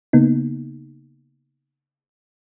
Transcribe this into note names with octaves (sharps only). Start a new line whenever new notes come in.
C#3 A#3 B3 D#4